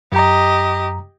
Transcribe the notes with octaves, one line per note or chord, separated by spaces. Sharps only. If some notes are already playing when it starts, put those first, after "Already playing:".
F#2 G4 D#5 A#5